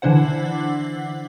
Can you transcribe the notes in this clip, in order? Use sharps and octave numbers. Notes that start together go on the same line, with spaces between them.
D3 E3 D4 E4 C5 F#5